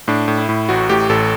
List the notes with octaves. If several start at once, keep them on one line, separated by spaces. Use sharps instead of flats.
A2 D4
A2
E4
A2
A1 F#4
A2 G4
A1 A4